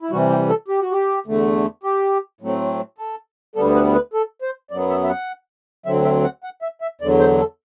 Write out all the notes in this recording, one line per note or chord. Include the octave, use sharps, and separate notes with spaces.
E4
C3 E3 G3 F#4
G4
A4
G4
F#4
G4
E2 D3 A3
G4
A2 F#3 A3 C4
A4
D2 D3 G3 B3 A4
B4
B4
A4
C5
F#2 F#3 B3 D5
E5
E5
F#5
D2 D3 F#3 C4 E5
E5
F#5
F#5
E5
E5
E2 D3 F#3 D5
C5
A4